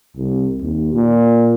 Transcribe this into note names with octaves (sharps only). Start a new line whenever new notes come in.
C2
D#2
A#2